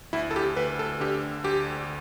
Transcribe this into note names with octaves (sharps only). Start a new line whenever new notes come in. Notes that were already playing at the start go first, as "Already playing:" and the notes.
D2 E4
A4
G4
D2 B4
A4
D3 G4
D2 G4